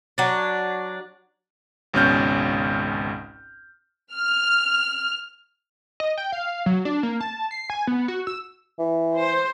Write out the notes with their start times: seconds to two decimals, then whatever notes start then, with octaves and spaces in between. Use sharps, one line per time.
0.18 F#3 D4
1.94 G#1 C#2 B2 C#4 F6 G6
4.14 F6
6.00 D#5
6.18 G5
6.32 F5
6.66 F#3
6.85 D4
7.03 A#3
7.21 A5
7.51 C7
7.70 G#5
7.87 B3
8.08 F#4
8.27 E6
8.79 E3
9.18 C5